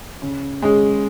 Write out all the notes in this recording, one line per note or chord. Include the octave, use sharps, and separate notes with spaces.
C#3
G#3 C#4 G#4